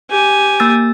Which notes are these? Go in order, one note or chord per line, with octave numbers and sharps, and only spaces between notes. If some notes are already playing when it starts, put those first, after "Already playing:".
G4 G#5
A#3 E6 A6